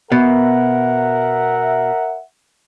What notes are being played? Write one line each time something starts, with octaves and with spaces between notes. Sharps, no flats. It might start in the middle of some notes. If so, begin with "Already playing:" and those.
B2 A#4 E5 F#5